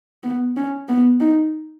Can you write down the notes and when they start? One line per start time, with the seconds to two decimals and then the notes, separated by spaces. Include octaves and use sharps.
0.24 B3
0.57 C#4
0.88 B3
1.20 D#4